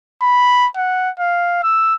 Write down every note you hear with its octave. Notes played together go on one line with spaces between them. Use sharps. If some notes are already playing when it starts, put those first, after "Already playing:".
B5
F#5
F5
E6